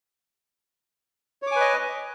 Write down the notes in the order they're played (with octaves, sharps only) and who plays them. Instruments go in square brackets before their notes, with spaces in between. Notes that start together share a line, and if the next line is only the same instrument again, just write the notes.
[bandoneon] C#5
D6
G#5
B4
D#5